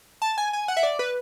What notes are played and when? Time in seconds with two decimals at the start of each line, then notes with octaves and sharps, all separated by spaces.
0.22 A5
0.38 G#5
0.53 G#5
0.68 F#5
0.77 E5
0.83 D5
0.99 B4